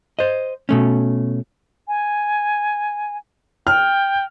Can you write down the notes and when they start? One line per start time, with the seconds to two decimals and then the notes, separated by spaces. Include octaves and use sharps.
0.19 C5 D#5
0.69 B2 A3 C#4
1.88 G#5
3.67 G5 F6